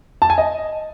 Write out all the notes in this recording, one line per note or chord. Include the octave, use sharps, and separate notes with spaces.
A5
G#5
D#5